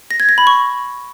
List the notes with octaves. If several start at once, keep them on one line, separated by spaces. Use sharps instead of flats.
A#6
G#6
A#6
B5
C#6